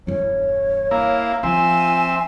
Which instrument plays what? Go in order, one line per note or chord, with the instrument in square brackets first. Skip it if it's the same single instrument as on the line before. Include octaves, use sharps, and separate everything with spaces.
[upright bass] E1 G2 [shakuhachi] C#5
[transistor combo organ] A#3 E4 [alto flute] F5
[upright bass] F3 [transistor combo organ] C4 E5 [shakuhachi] F4 [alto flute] G#5